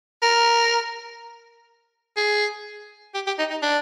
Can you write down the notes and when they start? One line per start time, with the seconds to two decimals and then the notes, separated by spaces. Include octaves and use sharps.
0.23 A#4
2.17 G#4
3.14 G4
3.27 G4
3.39 D#4
3.50 D#4
3.62 D4